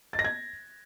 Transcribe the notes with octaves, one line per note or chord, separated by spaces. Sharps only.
A6
A#6
G#6